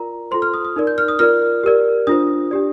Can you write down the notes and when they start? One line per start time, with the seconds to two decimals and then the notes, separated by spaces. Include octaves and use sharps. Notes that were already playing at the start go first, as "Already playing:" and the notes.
Already playing: F4 A#4 D5 A#5
0.31 F4 A4 C5 C6
0.42 F6
0.54 D#6
0.65 D#6
0.76 D#4 A#4 D5
0.87 G6
0.98 F6
1.08 D#6
1.19 F4 A#4 D5 F6
1.63 G4 A#4 D5
2.07 D4 F4 C5 D#6
2.51 D4 G4 D5